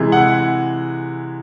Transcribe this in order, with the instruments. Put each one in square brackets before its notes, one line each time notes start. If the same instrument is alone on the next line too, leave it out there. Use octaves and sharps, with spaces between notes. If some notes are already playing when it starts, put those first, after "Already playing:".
Already playing: [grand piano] C3 E3 G#3
F#5